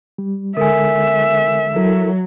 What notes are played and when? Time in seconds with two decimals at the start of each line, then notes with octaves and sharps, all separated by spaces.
0.18 G3
0.57 D3 G#3 A4 A#4 E5 G#5
1.76 F#3 E4 A4 A#4